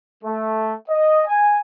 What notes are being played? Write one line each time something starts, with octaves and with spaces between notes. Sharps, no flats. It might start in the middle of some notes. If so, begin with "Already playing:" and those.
A3
D#5
G#5